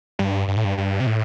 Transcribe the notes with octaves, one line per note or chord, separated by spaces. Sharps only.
G2
G2
A2
G2
G2
C3
A2